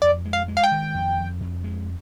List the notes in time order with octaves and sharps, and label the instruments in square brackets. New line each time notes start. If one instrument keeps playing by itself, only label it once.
[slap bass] F2 [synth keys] D5
[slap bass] G#3
[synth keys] F5
[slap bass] G#3
[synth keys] F5
G5
[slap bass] D#3
F2
F2
F2
G#3